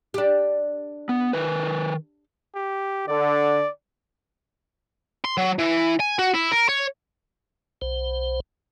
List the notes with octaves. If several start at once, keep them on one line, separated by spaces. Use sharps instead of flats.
D4 G4
B3
D#3 B4
G4
D3 D5
C6
F#3
E3
G#5
F#4
E4
A#4
C#5
B1 C5